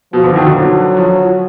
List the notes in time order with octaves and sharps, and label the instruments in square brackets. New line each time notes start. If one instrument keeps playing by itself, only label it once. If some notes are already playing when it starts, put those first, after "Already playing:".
[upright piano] B2 [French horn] F3
[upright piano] D3
D#3
B2
D3
[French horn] F#3
[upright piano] F3